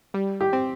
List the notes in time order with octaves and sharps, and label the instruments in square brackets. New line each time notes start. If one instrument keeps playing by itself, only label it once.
[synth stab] G3
[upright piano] G4
[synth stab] C4